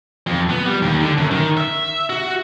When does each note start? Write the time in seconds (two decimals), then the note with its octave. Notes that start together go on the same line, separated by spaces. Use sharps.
0.27 F2
0.50 B3
0.66 G3
0.82 D#2
1.01 D3
1.18 F#2
1.31 D#3
1.57 E5
2.10 F#4